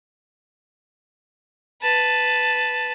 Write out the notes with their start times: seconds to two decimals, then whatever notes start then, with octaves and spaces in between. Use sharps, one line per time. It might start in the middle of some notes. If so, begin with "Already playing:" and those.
1.82 B4 A5